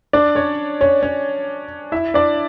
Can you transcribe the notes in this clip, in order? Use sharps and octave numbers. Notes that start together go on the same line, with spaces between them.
D4 D5
C#4 C#5
C#4 C#5
C#4 C#5
E4 E5
D4 D5